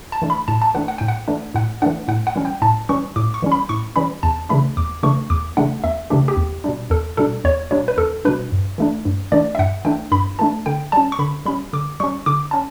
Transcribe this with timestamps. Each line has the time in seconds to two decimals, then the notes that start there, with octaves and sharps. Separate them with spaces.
0.12 A5
0.22 E3 A3 D4
0.30 B5
0.48 A2 A5
0.62 A5
0.75 E3 A3 D4 F#5
0.88 F#5
0.98 A2 G5
1.08 F#5
1.28 E3 A3 D4
1.54 A2 F#5
1.82 E3 A3 D4 F#5
2.08 A2 F#5
2.27 F#5
2.35 E3 G3 C#4
2.45 G5
2.62 A2 A5
2.89 E3 G3 C#4 C#6
3.16 A2 D6
3.34 C#6
3.42 E3 G3 C#4
3.52 B5
3.69 A2 C#6
3.96 E3 G3 C#4 B5
4.23 E2 A5
4.49 C#3 E3 A3 D4 B5
4.77 E2 D6
5.03 C#3 E3 A3 D4 C#6
5.30 E2 D6
5.57 C#3 E3 A3 D4 F#5
5.84 E2 E5
6.10 C#3 E3 A3 D4 G4
6.28 G4
6.37 E2
6.64 B2 G3 D4
6.90 E2 A4
7.17 B2 G3 D4 A4
7.44 E2 C#5
7.71 B2 G3 D4 C#5
7.88 B4
7.97 E2 A4
8.25 B2 G3 D4 B4
8.52 G2
8.78 E3 A3 D4
9.05 G2
9.32 E3 A3 D4 D5
9.55 E5
9.59 G2 F#5
9.85 E3 A3 D4 G5
10.12 G2 B5
10.39 E3 A3 D4 A5
10.66 D3 G5
10.92 G3 C#4 A5
11.12 C#6
11.19 D3 B5
11.46 G3 C#4 B5
11.73 D3 D6
12.00 G3 C#4 C#6
12.26 D3 D6
12.51 C#4 A5